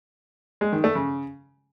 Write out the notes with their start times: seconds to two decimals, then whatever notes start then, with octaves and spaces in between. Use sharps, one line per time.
0.61 G#3
0.72 D#3
0.84 A3
0.95 C#3